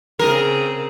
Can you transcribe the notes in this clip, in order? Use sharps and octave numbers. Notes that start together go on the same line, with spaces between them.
C#3 C4 G#4 A#4